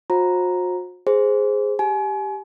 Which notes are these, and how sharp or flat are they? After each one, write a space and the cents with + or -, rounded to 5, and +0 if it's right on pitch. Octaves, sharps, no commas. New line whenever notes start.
F#4 -40 C5 +30 A#5 +0
G#4 +0 C5 +0
G4 +0 G#5 +35